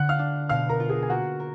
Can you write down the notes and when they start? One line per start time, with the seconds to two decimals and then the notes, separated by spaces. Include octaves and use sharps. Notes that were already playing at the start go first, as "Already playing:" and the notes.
Already playing: D3 F#5 F#6
0.09 F5 F6
0.19 D4
0.49 B2 F5 F6
0.69 A#4 A#5
0.80 F4
0.89 G#4 G#5
1.03 G#5
1.10 A#3 F#4 F#5
1.40 A#4